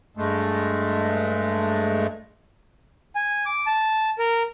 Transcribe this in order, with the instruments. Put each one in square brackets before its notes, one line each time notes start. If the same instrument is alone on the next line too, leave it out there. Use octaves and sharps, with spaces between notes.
[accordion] G2 G#3 A3
[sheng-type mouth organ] G#5
D6
A5
A#4